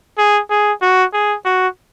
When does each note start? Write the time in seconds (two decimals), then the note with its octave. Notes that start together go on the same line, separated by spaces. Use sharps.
0.18 G#4
0.50 G#4
0.82 F#4
1.13 G#4
1.45 F#4